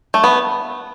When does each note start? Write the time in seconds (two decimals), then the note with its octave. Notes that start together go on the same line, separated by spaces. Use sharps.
0.14 A3
0.24 B3